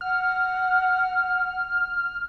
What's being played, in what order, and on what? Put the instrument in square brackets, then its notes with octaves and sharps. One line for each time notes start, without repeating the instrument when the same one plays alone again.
[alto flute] F#5 [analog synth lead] F6